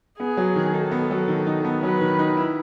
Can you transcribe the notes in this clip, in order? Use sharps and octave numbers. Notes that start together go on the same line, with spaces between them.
B3 G#4
F#3
D#3
D#4 A4
B3
F#3
D#3
D#4
B3
F#3 B4
D#3
D#4
E4